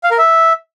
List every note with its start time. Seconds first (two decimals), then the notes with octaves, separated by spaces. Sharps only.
0.04 F5
0.11 A#4
0.18 E5